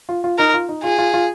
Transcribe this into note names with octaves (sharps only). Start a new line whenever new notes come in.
F4
F4
D#4 A#4
F4
D#4
F4 G#4
F4
F4